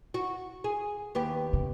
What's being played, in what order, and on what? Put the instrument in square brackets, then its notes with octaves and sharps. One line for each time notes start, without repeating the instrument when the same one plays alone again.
[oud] F#4
G#4
D#2 B3 G4
[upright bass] C#3